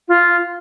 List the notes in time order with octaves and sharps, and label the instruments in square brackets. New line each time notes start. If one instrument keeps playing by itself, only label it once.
[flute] F4